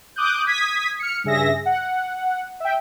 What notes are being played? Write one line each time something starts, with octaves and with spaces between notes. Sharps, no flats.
D6 D#6 F#6 G6
D#6 G#6 B6
F6 C#7
G2 C#3 G#4 E5 A#6
F#5
E5 G5